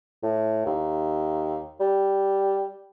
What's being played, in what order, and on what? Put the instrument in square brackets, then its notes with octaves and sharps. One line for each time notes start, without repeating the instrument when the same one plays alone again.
[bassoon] A2
D#2
G3